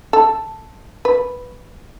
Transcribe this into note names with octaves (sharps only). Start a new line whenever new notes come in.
A4
B4